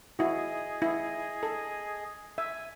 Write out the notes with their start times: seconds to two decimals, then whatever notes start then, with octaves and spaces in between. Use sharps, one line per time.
0.19 E4 F#4 G#4 D#5
0.82 E4
1.43 A4
2.38 E5 G#5